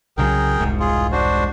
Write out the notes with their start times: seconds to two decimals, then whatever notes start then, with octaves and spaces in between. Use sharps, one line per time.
0.18 C2 C#3 F#3 G#4 A#4 G5
0.60 E1 C2 G#2
0.80 F4 G#4
1.12 D4 F#4 C5